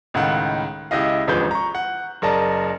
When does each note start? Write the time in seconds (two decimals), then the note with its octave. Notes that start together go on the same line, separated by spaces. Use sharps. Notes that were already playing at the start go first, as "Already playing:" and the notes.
0.14 C#2 A2 D#3 F5 F#5 F#6
0.91 C#2 E4 G4 D#5 F5
1.27 E1 A1 D2 F3 B4 G6
1.51 A#5 C#6
1.75 F#5
2.22 F#1 A#4 D5 D#5 A5